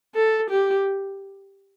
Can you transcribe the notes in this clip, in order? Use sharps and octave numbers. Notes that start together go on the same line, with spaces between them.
A4
G4